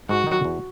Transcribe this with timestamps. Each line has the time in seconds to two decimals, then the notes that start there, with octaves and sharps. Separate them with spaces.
0.09 G#2 F#4
0.27 D#3 F#3
0.44 E2